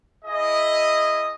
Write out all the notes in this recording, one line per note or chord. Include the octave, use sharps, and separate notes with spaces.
E4 G#4 D#5